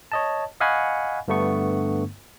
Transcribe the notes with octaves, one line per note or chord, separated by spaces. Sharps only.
C#5 D#5 A5
D#5 F5 F#5 G#5 B5 C#6
G2 D3 A3 B3 C#6